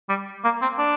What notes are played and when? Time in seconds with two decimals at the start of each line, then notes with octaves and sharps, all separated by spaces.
0.09 G3
0.44 A#3
0.62 C4
0.78 D4